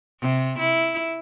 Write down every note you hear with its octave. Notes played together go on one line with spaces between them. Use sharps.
C3
E4